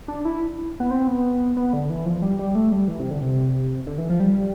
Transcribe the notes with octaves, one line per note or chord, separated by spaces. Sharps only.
D4
E4
B3
C4
B3
B3
D3
E3
F3
G3
G3
A3
G3
E3
C3
D3
C3
D3
E3
F3
G3